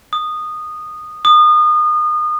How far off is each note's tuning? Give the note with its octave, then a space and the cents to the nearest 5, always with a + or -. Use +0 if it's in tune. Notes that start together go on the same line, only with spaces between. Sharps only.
D#6 -15
D#6 -30